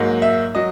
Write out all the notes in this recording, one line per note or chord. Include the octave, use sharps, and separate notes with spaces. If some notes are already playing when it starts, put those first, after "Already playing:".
Already playing: G#2 F#3 A#3
E5
F#3 D#5